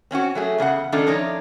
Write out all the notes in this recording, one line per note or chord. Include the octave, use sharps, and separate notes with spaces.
C4 C#4 F4 F#4
F#3 A3 G#4
E2 C#3 D4 F#5
D#3 A3 C#4 D4 F4 A4
F3 D4 D#4 C#5